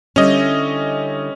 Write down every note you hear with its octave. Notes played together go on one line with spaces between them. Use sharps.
D3 G3 C#4 E4 D#5